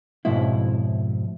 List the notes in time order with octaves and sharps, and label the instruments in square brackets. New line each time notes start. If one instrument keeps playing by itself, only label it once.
[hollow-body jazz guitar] F2 G#2 B2 E4